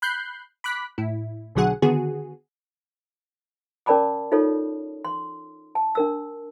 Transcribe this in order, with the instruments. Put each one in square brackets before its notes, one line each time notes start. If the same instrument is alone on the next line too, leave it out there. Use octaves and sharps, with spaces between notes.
[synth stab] B5 F#6 G6 C7
B5 D6 F#6 B6
A2 E4
B1 B2 D3 F#3 G#4 F#5
D3 D#3 B3 F#4 G#4
[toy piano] C#4 A#4 D5 A5 B5 D6
D#4 F4 A4 C#5
C6
A5
D4 A#4 E6